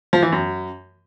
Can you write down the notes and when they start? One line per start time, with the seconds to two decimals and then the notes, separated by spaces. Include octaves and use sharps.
0.13 F3
0.23 E3
0.32 F#2